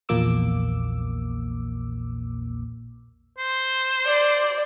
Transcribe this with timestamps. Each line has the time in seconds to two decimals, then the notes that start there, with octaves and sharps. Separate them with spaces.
0.09 A#1 E2 A#2 A#3 D6 E6
3.38 C5
4.06 D5